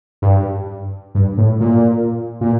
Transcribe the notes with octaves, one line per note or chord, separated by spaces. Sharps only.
G2
G2
A2
A#2
A#2